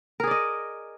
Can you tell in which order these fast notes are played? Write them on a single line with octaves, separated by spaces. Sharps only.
A#4 G#4 D5 D#5